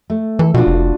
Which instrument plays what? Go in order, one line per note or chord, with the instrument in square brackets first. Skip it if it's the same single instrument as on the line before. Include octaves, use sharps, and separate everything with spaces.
[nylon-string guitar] A3
[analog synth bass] E3 [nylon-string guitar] A4
[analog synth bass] B2 [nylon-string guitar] D4 F4 F#4
[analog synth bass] F1